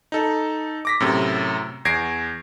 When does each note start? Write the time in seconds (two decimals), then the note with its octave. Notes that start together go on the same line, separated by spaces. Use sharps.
0.12 D#4 A4
0.85 D6 A#6 B6
1.00 F#2 A2 C3
1.85 E2 G#6 A#6 C7 D7